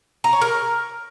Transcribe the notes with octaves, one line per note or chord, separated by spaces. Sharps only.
A#5
C#5
A#4